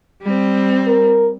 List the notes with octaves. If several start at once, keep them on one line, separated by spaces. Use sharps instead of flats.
G3 C4
A#4